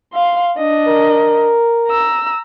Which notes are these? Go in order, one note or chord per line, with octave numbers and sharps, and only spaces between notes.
F5 C6
D4 D#5
A#4
A#5 E6